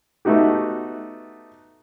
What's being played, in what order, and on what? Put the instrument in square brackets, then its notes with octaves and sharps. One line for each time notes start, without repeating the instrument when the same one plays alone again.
[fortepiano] A3 B3 D#4 F#4 G4